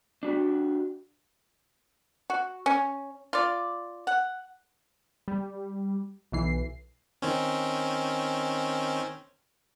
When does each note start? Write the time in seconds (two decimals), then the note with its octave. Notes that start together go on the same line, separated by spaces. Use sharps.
0.23 D4 F#4 G4
2.30 F#4
2.66 C#4
3.33 F4 D5
4.07 F#5
5.28 G3
6.32 B1 E3 C7
7.22 D#3 C4 C#4